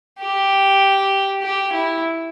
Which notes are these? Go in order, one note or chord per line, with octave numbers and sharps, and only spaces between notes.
G4
G4
E4